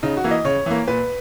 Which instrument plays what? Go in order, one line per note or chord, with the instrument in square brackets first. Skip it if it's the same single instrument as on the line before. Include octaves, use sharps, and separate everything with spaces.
[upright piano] C#3 D#4
F#4
E3 A#3
D#5
C#3 C#5
E3 A#3
A#2 B4